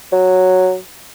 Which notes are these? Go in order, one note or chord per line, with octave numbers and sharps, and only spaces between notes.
F#3